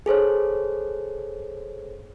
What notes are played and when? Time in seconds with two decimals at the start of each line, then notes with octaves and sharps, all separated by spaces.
0.06 G#4 A4 C5 C#5